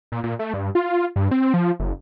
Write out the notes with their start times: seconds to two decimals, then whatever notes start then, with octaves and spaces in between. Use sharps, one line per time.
0.12 A#2
0.24 A#2
0.39 A3
0.54 G2
0.75 F4
1.16 G2
1.31 C4
1.54 F3
1.80 F#1